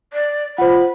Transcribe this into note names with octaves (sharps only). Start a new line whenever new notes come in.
D5
F4 C5 F#5 B5